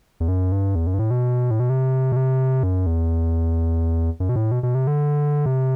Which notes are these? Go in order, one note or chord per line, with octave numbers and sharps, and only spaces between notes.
E2
F#2
G2
E2
F#2
G2
A2
B2
A2
B2
C3
B2
C3
F#2
E2
F#2
B2
A2
B2
B2
C3
D3
C3